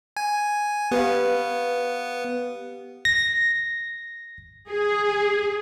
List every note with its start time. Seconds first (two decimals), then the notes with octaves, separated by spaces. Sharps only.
0.17 G#5
0.91 B3 G4 B4 F5
3.05 A#6
4.68 G#4